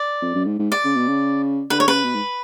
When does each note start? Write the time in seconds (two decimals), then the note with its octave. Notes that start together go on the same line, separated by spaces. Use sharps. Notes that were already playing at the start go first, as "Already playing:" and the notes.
Already playing: D5
0.22 F2
0.35 F#2
0.46 G#2
0.59 G#2
0.72 D5
0.84 C#3
0.96 B2
1.08 C#3
1.70 D3 B4
1.80 C#5
1.87 C#3 B4
2.04 B2
2.15 G#2